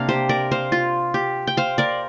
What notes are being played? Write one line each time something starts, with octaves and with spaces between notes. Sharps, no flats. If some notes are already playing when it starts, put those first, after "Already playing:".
Already playing: C3 A#3 D4 F5
G4 C5
A#4 D5
C5 F5
F4
G4
G5
C5 F5
A#4 D5